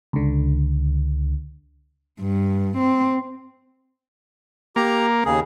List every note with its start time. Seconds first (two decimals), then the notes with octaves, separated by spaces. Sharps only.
0.13 C#2 D3
2.20 G2
2.78 C4
4.76 A#3 G4 A#5
5.25 D#2 C#3 G#4